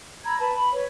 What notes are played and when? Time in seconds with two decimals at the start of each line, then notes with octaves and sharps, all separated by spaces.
0.25 A#5 B5 E6 G#6
0.39 B4 A5 B5
0.54 B5
0.72 B4 C#5